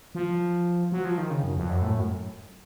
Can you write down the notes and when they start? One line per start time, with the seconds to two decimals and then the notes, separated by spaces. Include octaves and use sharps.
0.15 F3
0.92 F#3
1.05 F3
1.18 D#3
1.30 C#3
1.43 F#2
1.56 F2
1.69 F#2
1.82 A2
1.95 F#2